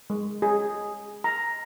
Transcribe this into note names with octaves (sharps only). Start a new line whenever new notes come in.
G#3
G#4
A#5